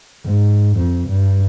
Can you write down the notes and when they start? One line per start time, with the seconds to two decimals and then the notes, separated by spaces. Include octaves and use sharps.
0.25 G#2
0.76 F2
1.09 G2